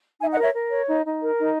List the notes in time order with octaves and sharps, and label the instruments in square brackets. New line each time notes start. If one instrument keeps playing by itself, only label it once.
[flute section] D#4 E5 G#5
D#5 F#5
A#4
C#5 E5
A#4
C#5
D#4
D#4
A#4
D#4